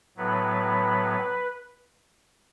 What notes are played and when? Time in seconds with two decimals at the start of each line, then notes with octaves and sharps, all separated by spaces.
0.17 A2 F#3 B3 B4